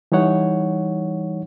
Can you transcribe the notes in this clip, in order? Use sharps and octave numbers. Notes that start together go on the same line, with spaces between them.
E3 G3 D#4 C#5 F#5